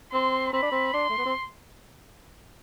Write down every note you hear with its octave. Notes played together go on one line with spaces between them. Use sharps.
C4 C6
C4 B5
D4
C4
D4 C6
A3
B3
C4